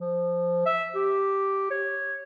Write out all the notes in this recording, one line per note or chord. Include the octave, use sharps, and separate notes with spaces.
F3
E5
G4
C#5